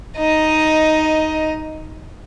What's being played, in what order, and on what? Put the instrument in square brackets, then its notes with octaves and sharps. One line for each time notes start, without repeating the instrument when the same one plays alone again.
[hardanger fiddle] D#4 D#5